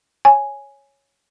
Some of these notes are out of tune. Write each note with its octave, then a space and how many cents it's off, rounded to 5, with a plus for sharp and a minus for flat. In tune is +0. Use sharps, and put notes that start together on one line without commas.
C#5 +0 G#5 +0